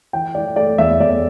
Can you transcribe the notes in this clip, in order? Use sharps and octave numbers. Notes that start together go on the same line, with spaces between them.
E3 G5
E3 D5
A3 D5
E2 E5
E2 D5